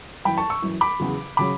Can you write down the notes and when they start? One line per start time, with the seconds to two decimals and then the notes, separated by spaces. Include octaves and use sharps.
0.25 F#2 E3 G5 B5
0.37 A5 C#6
0.50 C#6 E6
0.62 F#2 E3
0.81 B5 D6
1.00 E2 C#3 F#3
1.37 C#3 F#3 B5 D6